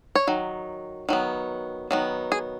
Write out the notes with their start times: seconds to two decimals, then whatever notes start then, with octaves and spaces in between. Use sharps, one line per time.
0.15 C#5
0.27 D#3 F#3
1.09 D#3 F#3 B3
1.91 D#3 F#3 B3
2.32 G#4